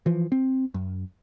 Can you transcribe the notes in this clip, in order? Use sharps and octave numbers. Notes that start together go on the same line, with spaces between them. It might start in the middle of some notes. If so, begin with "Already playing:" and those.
E3 F3
C4
F#2